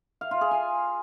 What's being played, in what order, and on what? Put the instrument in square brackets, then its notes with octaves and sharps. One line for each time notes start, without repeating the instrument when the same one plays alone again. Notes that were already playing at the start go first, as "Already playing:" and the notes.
[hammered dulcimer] F5
F4
G#4
G#5